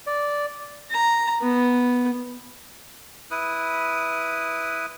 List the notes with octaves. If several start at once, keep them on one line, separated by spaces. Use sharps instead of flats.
D5
A#5
B3
E4 B4 D#6